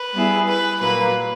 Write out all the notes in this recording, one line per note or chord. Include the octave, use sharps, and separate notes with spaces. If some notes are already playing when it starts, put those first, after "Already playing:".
Already playing: B4
G3 B3 E4 G#4
B4
A#2 F#3 A#3 B4